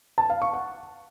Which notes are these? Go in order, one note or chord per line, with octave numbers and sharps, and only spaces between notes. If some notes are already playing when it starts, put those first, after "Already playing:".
A5
F5
C#6
F#5